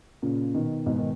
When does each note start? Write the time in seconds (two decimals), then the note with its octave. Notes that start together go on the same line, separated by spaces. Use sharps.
0.22 A#2 C#3
0.55 B2 D#3
0.86 G#2 B2
0.98 D#3